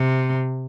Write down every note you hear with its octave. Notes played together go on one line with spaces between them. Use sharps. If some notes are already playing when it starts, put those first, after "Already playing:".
Already playing: C3